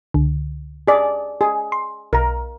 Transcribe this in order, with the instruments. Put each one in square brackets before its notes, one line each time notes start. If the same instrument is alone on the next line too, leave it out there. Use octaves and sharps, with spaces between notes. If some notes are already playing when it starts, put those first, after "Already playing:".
[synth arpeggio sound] C#2 D3
[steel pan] G#4 D5
G#4
[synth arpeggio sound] C6
[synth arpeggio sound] B1 A#5 [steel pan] A#4